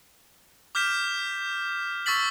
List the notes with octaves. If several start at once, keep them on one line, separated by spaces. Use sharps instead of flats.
D6 F6 G6 B6 E7
C#6 E6 A6 B6 F#7